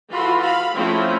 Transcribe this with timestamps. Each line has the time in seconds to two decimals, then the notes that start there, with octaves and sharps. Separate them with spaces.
0.11 E3 F4 F#4 A4 B5 C6
0.41 F5 B5
0.73 F3 A3 C4 C#4 E4